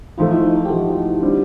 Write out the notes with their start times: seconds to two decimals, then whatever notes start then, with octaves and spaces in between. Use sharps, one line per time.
0.18 G#2 F3 A3 F4
0.31 E4
0.43 D#4
0.57 F4
0.65 G4
0.70 G#2 F3 A3 F#4
1.21 D3 G3 C4